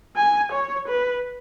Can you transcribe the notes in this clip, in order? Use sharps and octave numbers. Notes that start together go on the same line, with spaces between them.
G#5
C#5
B4